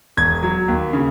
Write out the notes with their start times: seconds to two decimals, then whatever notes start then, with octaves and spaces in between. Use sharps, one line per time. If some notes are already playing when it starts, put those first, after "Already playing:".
0.17 E1 G#6
0.43 F#3
0.68 D#2
0.93 C#3